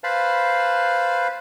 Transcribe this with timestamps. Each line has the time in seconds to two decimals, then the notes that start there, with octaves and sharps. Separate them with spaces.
0.04 B4 C5 F5 A5 B5